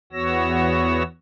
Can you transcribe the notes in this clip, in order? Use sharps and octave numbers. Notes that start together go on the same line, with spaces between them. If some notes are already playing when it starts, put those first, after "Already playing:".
E2 B3 F#4 C#5 E6 A#6